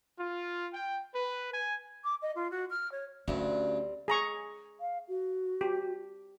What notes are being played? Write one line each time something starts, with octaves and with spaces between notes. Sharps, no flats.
F4
G5
B4
G#5
D6
D#5
F4
F#4
F6
C#5
D2 G2 G3 C4 C#4
G#4 A#5 C#6
F5
F#4
G4